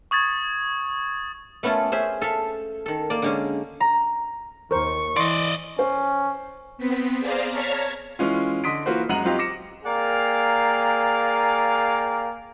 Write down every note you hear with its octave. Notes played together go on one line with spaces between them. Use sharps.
C#6 D#6 G#6 A6
A3 B3 C#4 F4 A4
C#4 G#4 C5 E5
A4 E5 F5
D#3 A4
A#3 D5
D3 G#3 C#4
A#5
D#2 A#4 C5 C#6
E3 D5 D#5 C6
C#4 C5
B3 C4 B6
G#4 C5 D5 F5 A#5
C#5 A5 A#5 F6 G#6 B6
E3 G#3 C#4 F4
D3 D#5 C6 D#6 B6 D7
E3 A#3 F4 F#4 B4 C5
F#2 G#3 F#5 A#5 D#7 F#7
F#3 C4 F4 G4 D#5 F5
D6 A#6 C#7 E7
A#3 G#4 D5 F5 G5 A#5